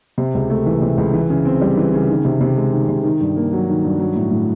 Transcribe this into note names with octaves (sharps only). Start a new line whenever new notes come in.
C3
C#2
A3
E3
C3
C#2
E3
C#3
C4
G3
E3
C#3
D#3
C3
C3
G#3
D#3
C3
D#3
G2
A#3
F#3
D#3
G2
F#3
A2
A2